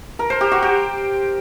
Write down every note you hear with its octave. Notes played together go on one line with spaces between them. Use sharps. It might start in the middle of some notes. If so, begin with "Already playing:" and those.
A#4
C5
G4
F#4
G4